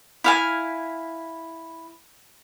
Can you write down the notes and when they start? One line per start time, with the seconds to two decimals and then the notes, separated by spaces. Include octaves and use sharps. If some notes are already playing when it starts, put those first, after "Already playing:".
0.24 E4 F5 G#5